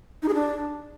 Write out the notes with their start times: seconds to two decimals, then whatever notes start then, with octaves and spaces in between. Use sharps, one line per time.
0.23 D#4
0.28 G#4
0.34 D4